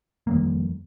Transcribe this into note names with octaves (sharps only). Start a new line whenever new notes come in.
F2 D#3 G3 A#3